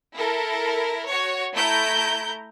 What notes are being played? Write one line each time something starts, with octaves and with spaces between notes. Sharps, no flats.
E4 A4 A#4
F#4 C#5
A3 E4 A#5 G6